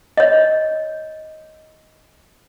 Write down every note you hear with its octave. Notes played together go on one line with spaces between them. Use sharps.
C#5 D#5